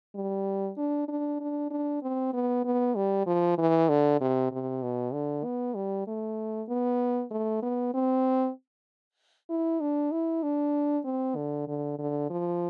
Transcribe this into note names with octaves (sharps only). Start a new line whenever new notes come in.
G3
D4
D4
D4
D4
C4
B3
B3
G3
F3
E3
D3
C3
C3
B2
D3
B3
G3
A3
B3
A3
B3
C4
E4
D4
E4
D4
C4
D3
D3
D3
F3